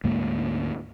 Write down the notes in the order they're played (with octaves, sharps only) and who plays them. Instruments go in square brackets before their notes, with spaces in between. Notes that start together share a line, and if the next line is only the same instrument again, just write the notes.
[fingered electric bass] D2 G#2 G#3 A#3